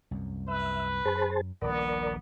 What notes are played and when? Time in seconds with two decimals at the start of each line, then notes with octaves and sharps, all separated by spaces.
0.11 C2 F#2
0.48 B4 E5
1.05 F#2 G#4 C5 A5
1.62 D#1 A#1 B3 A#4 D5